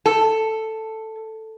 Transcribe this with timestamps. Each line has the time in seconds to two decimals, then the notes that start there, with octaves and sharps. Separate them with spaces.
0.06 A4